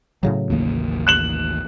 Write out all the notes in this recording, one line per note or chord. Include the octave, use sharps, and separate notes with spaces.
A2 C#3 F#3
A1 D#2 A#3
F#6 E7 F#7